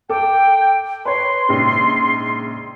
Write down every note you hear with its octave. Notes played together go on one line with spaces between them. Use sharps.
A4 G5 D6
B4 C#5 C6
A#1 G#2 C#3